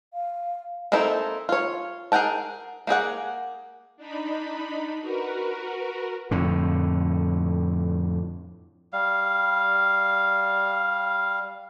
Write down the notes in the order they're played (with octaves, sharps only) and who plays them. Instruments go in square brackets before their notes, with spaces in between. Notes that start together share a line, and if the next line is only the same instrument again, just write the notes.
[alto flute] F5
[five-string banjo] A#3 C4 D#4 E4 A4
F4 C#5
G#4 A#4 F#5 G5 A5
A#3 G4 G#4 F#5
[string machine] D4 D#4 B5
F#4 A#4 B4
[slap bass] F2 A2 D3
[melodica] G3 F5